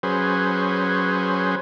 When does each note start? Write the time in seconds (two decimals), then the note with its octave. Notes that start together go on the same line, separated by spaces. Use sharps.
0.03 F#3 C#4 G#4 B4 C5